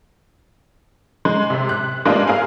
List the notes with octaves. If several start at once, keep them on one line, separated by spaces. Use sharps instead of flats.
G#3
C3
F#6
G3 G#3 A#3 B3 D4 F4
G#4 A#4 F5 G#5